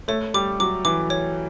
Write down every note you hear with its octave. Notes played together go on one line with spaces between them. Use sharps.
A3 C#5
G3 D6
F#3 D6
E3 D6
C#5